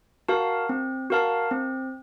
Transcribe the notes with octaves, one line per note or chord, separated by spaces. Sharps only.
F#4 A#4 F5 A5
C4
F#4 A#4 F5 A5
C4